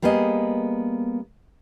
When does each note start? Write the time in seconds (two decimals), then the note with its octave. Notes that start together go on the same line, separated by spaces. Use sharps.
0.02 G3 A#3 B3 G#4 D#5